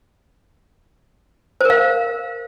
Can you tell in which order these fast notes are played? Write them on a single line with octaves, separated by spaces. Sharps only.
C5 A#4 F5